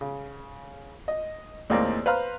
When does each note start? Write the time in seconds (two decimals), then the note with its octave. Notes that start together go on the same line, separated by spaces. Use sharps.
0.01 C#3
1.08 D#5
1.70 D#2 A2 G#3 A#3 C4 D5
2.06 B4 C5 F5 A#5 F6